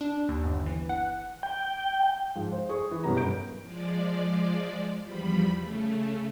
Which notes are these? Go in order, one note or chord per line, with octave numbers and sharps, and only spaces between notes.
D4
D#2
G1
E3
F#5
G5
G#2 F3
C5
G#4 C#6 D#6
E3
F#2 B2 B3 G4 B4 A#5
G1 G6 D7
F3 G#3 D5
E2 F3 G3 B5
C#3 A3